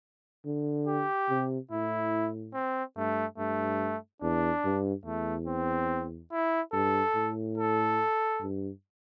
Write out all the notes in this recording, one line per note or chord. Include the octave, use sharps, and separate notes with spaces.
D3
G4
C3
A2 E4
C4
G2 A3
G2 A3
E2 D4
G2
E2 A3
C4
E4
G2 A4
A2
A4
G2